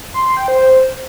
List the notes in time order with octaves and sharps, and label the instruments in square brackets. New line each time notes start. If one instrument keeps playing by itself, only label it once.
[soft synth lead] C6
C6
G5
C5